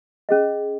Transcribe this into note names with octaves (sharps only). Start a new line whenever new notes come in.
C#4 G#4 D#5